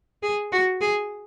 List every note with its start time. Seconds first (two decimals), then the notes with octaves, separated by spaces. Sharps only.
0.23 G#4
0.52 F#4
0.81 G#4